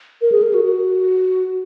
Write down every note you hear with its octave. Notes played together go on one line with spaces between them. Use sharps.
A#4
G#4
A#4
F#4
F#4